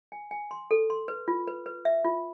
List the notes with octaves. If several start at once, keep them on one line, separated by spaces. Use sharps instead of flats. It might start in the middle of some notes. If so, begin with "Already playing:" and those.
G#5
G#5
C6
A4
C6
B4
F4
B4
B4
E5
F4